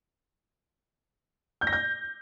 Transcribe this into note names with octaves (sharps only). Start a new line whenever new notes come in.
G6
A#6
G6